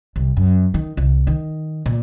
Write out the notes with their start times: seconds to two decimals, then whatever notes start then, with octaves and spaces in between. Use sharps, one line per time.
0.16 C2
0.37 F#2
0.74 D#3
0.97 C2
1.27 D#3
1.86 A#2